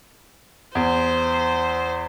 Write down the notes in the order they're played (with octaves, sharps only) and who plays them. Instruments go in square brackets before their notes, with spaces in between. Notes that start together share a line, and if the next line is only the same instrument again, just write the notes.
[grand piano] E2 [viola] C5